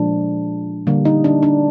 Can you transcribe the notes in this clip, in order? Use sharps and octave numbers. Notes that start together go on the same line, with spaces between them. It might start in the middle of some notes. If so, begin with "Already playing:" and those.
Already playing: A#2 F3 G#3 D4
D3 G3 A#3
D#4
D4
D4